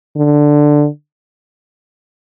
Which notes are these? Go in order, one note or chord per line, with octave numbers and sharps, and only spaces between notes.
D3